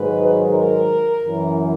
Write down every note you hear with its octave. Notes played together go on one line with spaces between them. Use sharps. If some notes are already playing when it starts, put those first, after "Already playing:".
Already playing: G#2 D#3 F#3 B4
A#4
F#2 E3